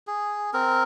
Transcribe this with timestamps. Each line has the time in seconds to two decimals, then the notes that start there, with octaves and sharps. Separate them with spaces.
0.07 G#4
0.53 C4 A#4